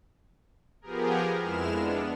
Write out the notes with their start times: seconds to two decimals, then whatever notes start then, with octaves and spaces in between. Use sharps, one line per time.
0.81 F3 B3 G4 G#4 A#4
1.41 F2 G#3 E4 F6 E7
1.71 B3 D4